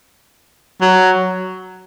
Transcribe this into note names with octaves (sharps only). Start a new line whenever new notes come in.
F#3